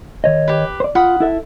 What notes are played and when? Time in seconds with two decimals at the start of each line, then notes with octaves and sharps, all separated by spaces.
0.24 D#3 C#5 D#5
0.48 G4 B4
0.80 C5 D5
0.95 F4 F#5 B5 D#6
1.20 E4 A4 E5